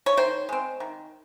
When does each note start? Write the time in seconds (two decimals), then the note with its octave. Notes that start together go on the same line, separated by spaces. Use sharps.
0.06 C#5
0.17 D#3 C5
0.49 G#3 C4
0.80 D#3